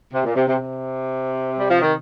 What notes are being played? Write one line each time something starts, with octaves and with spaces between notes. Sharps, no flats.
C3
A#2
C3
C3
C3
G3
F3
D#3